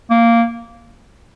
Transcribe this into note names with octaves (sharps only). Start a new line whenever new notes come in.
A#3